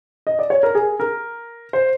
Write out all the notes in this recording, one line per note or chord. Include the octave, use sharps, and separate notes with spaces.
D#5
D5
C#5
A#4
G#4
A#4
C5